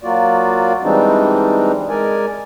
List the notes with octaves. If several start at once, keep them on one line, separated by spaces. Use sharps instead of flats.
F#3 A#3 F4 F#4 D5
E3 G3 G#3 C4 D4 D#4
G#3 A#4 D5 G#5